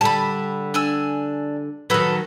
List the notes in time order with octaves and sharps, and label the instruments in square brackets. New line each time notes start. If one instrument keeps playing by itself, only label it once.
[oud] D3 G3 [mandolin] A5 B5
[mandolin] D4 G#5 E6
[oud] D#3 F#3 [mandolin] A4 B4